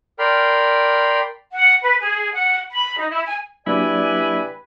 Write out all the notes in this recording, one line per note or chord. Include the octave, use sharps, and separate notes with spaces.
A#4 D5 G5 B5 C6 F6
F#5
B4
G#4
F#5
B5
D#4
E4
G#5
F#3 A#3 D4 E4 G4 B4 D5 G#5